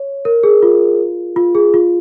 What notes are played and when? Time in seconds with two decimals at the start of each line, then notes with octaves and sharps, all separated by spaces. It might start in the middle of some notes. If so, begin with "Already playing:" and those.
Already playing: C#5
0.25 A#4
0.43 G#4
0.63 F4
1.36 F4
1.55 G#4
1.74 F4